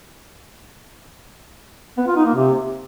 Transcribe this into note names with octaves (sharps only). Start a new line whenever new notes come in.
B3
F4
D#4
A#3
C3